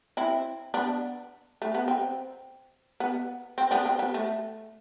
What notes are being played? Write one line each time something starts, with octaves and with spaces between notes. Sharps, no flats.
C4 E4
B3 D4
A3
B3
C4
B3
C4
B3 D4
C4
B3
A3